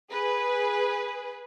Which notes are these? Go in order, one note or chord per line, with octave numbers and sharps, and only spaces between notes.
G#4 B4